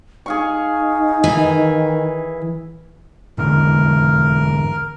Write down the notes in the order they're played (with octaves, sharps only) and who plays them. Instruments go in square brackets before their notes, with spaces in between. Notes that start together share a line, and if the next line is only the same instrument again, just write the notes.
[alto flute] D#4 [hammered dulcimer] G#4 F5 C#6
[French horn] D#3 [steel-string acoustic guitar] E3
[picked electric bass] G#2 D3 E3 [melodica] A#4